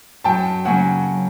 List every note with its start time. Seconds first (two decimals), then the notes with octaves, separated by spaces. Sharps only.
0.24 F#2 G5 A5
0.65 C#3 F#3 A#3 C#4 F#5 G#5